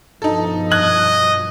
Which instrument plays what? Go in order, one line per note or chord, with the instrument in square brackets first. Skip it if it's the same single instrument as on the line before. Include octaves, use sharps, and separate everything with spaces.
[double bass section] G2 B2 F3 [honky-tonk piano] D#4 A4
[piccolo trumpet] D#5 [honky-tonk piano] F#6 G#6 F#7